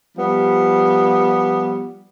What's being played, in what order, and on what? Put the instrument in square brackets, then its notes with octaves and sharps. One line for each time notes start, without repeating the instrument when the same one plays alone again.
[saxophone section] F3 G3 B3